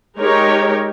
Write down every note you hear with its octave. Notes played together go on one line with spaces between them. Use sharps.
G#3 D#4 G4 A#4 C#5